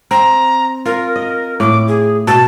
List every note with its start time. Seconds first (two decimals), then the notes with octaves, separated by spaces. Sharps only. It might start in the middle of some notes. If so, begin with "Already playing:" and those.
0.11 C4 A#5
0.86 F4 A#4
1.16 D#5
1.60 A2 D6
1.88 G#4
2.27 B2 A5